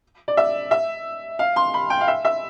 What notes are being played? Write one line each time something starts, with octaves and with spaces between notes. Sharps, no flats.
D5
E5
E5
F5
C6
B5
G5
F5
E5
E5